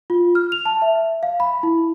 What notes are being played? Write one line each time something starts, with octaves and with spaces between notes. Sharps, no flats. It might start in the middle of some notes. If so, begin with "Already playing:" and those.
F4
F6
F7
A5
E5
F5
B5
E4